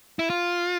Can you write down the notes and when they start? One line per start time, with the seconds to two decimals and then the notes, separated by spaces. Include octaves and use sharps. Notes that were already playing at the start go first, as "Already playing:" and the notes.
0.19 E4
0.30 F4